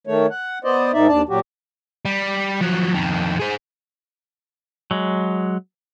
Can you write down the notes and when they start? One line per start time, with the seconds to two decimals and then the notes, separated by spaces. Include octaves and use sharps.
0.07 D#3 A3 C#5
0.30 F#5
0.65 B3 C5 D5 D#5
0.94 G#2 D#3 D#4 D5 E5
1.08 D#2 D4 D5 A5
1.29 A#2 F#3 F#4 G4
2.05 G3
2.61 F3 F#3
2.94 F2 D#3
3.40 G#4 C5
4.91 F#3 G#3